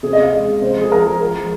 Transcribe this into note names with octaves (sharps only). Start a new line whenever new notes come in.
C3 G#4
D#5
C3 F5
G#3 D#5
G#3
C3 C5
F3 G#4
F3 A#4
F3 G#4
F3 A#4
G#3